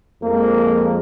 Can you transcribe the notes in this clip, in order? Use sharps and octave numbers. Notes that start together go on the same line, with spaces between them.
F2 F3 G#3 A#3